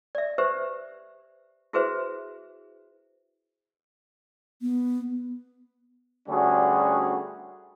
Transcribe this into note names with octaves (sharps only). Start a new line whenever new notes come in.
D5 E5
G4 B4 C5 E5
E4 F#4 G#4 B4 C5 E5
B3
D2 D3 G3 C#4 F#4 G#4